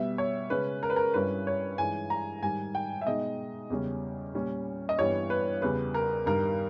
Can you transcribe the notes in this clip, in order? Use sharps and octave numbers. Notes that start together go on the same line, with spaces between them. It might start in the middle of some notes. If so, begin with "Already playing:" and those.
Already playing: B2 G3 B3 E5
C#5
C#3 G#3 C#4 B4
A#4
B4
A#4
G2 G3 C#4 E4 B4
C#5
G2 E3 G#3 D#4 G#5
A#5
G#2 D#3 G3 G#5
G5
E5
B2 G#3 D#4 D#5
E2 C#3 G3 C#4
A#2 G3 C#4
D#5
G2 E3 G3 B3 C#5
B4
E2 C#3 G3 B3 B4
A#4
G2 D#3 G3 A#4